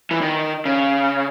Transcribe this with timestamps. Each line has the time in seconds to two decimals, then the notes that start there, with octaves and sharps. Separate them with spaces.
0.11 E3
0.21 D#3
0.65 C#3